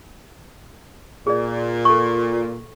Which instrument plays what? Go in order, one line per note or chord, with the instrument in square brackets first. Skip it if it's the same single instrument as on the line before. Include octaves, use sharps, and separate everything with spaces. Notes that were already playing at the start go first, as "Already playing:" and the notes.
[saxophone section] A#2 [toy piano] G#4 D5
[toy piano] A4 C#6